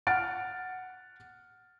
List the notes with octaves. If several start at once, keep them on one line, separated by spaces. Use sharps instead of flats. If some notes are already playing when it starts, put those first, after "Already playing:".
F#5 F6 A6 D7